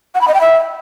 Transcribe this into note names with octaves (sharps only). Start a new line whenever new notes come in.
F#5
B5
D#5
G5
E5